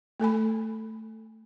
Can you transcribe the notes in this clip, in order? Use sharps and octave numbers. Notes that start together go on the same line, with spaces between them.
A3 A4 G#5 B5